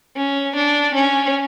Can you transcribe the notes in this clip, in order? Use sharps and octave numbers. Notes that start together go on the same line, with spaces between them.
C#4
D4
C#4